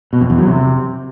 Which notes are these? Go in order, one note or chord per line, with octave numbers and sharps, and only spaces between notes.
B2
F2
E2
F#3
C3